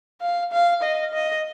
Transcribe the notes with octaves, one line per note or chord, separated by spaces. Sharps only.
F5
F5
D#5
D#5